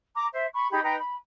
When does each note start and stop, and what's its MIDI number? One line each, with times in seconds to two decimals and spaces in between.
0.15 0.26 82
0.15 0.26 86
0.32 0.46 72
0.32 0.46 76
0.53 0.69 83
0.53 0.69 85
0.71 0.80 63
0.71 0.80 67
0.71 0.80 68
0.71 0.80 83
0.83 0.96 63
0.83 0.96 71
0.83 0.96 79
0.83 0.96 82
0.98 1.15 83